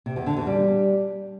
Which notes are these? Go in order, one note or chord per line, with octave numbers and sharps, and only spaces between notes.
C3
E2
D3
E2
G3